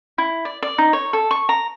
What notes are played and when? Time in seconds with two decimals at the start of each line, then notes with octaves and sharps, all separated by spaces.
0.18 E4
0.45 D5
0.62 D5
0.78 D#4
0.93 C#5
1.13 A4
1.31 C#6
1.49 A#5